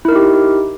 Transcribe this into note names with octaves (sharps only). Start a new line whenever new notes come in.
D#4 E4 G4 A#4